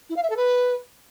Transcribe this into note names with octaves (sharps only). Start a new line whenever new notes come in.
E4
F5
E5
A4
B4